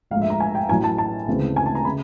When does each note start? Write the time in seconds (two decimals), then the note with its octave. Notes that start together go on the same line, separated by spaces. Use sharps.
0.11 A#1 G#2 F3 A3 F5
0.21 E5
0.30 A#5
0.40 G#5
0.55 G5
0.69 A1 A2 F#3 G#5
0.84 A5
0.98 A5
1.28 D2 C#3 E3 G#3 C4
1.56 G#5
1.66 A5
1.75 A#5
1.85 C#3 B5